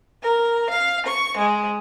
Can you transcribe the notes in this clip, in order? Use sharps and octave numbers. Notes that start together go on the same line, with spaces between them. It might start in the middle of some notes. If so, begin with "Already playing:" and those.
A#4
F5
C#6
G#3